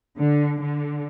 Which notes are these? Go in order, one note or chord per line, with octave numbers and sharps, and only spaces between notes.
D3
D3